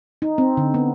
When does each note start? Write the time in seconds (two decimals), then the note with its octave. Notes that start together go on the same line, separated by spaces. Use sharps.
0.22 D#4
0.38 C4
0.57 D3
0.74 B3